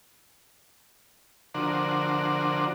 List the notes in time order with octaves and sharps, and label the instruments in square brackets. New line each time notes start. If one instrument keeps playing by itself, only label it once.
[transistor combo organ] D3 F3 D4 F#4 A#4 C5